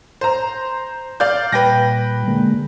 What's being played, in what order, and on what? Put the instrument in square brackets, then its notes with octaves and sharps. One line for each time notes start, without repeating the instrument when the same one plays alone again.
[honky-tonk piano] C5 A#5
D5 F5 G6
[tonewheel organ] A#2 G3 [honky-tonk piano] B4 G5 A#6
[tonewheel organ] D3 G#3 A#3